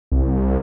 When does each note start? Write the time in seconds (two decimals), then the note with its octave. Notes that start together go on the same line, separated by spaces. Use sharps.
0.12 C2